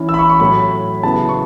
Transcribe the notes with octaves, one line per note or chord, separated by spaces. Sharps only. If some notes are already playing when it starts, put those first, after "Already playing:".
Already playing: E3 C#4 E4
E6
B5
C#6
C#6
A2 F#3 A3 B5
C#3 F#3 B3 E4 A5
C#6